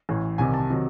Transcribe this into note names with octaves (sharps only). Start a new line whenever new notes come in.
A1 A2 E3
C2 C3 D#3 G#5
A5
C3 D#3 F#3